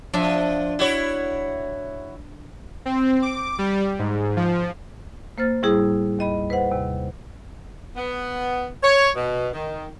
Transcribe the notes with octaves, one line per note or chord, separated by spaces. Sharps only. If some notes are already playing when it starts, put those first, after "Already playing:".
F3 D4 E5
E4 F#4 C#5
C4
D6
G3
G#2
F3
A#3 C5 F6 A6
A2 G3 E4 G#4 D#6
D#2 D#5 B5
B4 C5 F#5
D#2 C3
B3
C#5
B2
D#3